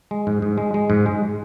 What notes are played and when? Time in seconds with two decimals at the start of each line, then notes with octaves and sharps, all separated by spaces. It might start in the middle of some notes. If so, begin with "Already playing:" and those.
0.11 G#3
0.27 G#2
0.42 G#2
0.58 G#3
0.74 G#3
0.90 G#2
1.06 G#3